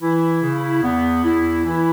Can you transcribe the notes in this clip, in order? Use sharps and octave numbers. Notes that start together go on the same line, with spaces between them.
E3 E4
C#3
E2 B3
E2 E4
E3 E4